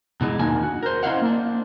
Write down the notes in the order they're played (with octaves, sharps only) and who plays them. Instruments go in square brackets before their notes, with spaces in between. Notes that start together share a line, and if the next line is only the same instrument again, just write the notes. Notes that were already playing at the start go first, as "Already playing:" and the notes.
[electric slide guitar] B2 E3 G#3
E2 D#3 A#3 D4 F#4 G#5
F#4
A#4 C5
C#4 E4 C5 D#5 F5 F#5
A#3 D4